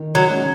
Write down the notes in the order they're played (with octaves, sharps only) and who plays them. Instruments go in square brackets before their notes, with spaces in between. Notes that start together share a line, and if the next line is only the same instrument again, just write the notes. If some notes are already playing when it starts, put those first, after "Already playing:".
Already playing: [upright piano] D#3
[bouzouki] F#3
[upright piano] G#3 C#4